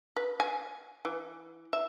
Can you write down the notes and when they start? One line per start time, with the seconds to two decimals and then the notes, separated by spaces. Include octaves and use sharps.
0.16 B4
0.40 G#5
1.05 E3
1.73 E5